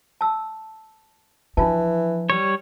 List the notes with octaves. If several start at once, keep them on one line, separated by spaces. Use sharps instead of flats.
A5 E6
E3 F3 D4 F4 A5
G3 C#5